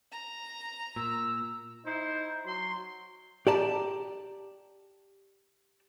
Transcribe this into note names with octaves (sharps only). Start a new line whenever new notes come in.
A#5
A#2 E6
D#4 E4 C5
F#3 C6
G4 D5 A5 A#5